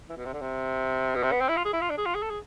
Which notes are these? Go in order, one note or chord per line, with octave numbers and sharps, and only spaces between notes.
E3
B2
C3
D3
C3
B2
C3
B3
C4
E4
F4
G#4
E4
F4
D4
G#4
F4
G#4
A4
G#4